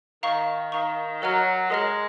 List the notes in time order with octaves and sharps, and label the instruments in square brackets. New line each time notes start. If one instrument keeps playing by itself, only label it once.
[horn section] D#3 [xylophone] F5 A#5 C#6
[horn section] D#3 [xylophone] F5 A#5 C#6
[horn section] F#3 [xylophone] A#4 D#5 A#5 F6
[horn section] G#3 [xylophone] A#4 D#5 A#5 F6